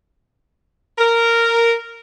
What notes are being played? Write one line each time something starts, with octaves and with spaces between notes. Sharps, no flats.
A#4